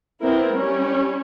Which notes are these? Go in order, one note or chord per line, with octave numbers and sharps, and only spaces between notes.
B3 C4 E4 A#4
G3 C#4